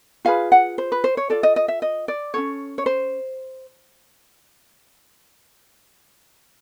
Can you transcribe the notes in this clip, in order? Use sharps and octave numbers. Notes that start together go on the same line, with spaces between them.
F4 G#4 B4 F5
F#5
C5
B4
C5
C#5
F4 A4 D5
D#5
D#5
E5
D#5
D5
C#4 F4 A4 C#5
C#5
C5